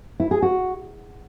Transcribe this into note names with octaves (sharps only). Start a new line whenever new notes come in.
E4
G#4
F#4